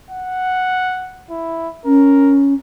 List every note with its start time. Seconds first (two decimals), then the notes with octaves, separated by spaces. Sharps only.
0.11 F#5
1.30 E4
1.85 C#4 A#4